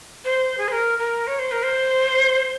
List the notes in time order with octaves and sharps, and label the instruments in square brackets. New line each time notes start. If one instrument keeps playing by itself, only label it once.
[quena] C5
G#4
C5
A#4
A#4
C#5
C5
A#4
C5